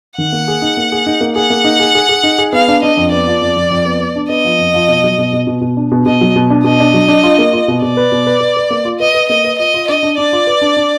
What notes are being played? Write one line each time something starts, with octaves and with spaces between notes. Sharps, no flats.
D#3 F#5
A#3
G#4
D#4
A#3
G#4
D#4
A#3
G#4 F#5
A#3
D#4
G#4
G#4
G#4
D#4
G#4
B3 F5
D4
D4 D#5
F2
B3 D5
F3
F2
F2
F2
B3
B3
D4
B3 D#5
F3
F2
F3
B2
F#3
B2
B2
B2
B2
D4
B2
B2 D#5
F#3
B2
D4
B2 D#5
D4
F#3
D4
F4
A#3
F4
B2
B2 D5
B4
B2
B4
B4
B4
A#3
F4
B4 D#5
B4
A#3 D#5
B4
F4 D#5
F4
D4 D#5
D4
D4 D5
F4
B4
D4
D4